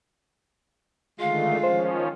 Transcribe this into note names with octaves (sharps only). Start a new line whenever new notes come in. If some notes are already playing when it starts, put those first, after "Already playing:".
D3 D#3 G#3 A3 F4 F5
D#3 F3 C#4 C5